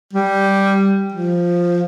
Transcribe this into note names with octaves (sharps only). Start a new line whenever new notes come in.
G3
F3